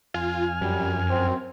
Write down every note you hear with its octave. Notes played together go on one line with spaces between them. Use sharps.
F2 F4 G#5 F6
F#2 G3
C4